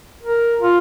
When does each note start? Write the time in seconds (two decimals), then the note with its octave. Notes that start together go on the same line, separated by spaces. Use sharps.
0.23 A#4
0.60 F4